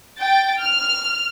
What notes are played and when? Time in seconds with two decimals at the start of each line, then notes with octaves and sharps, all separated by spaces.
0.19 G5 A6
0.58 F6